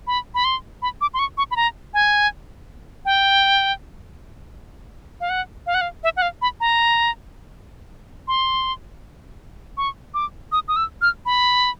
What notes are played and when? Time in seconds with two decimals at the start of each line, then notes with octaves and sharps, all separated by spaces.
0.07 B5
0.35 B5
0.44 C6
0.82 B5
1.01 D6
1.14 C6
1.19 C#6
1.38 C#6
1.51 B5
1.56 A#5
1.94 G#5
3.05 G5
5.21 F5
5.30 F#5
5.67 F5
5.74 F#5
5.81 F5
6.04 E5
6.17 F#5
6.22 F5
6.42 B5
6.60 A#5
8.28 C6
9.77 C#6
10.14 D6
10.52 D#6
10.68 D#6
10.76 E6
11.02 F6
11.26 B5